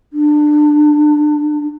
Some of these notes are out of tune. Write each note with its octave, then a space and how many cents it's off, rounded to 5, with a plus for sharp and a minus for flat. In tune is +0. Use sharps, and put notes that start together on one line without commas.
D4 +25